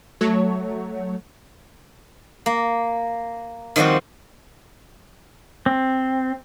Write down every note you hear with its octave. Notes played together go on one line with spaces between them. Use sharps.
F#3 A3 C#5
A#3
D#3 F3 G3 C4 F#4
C4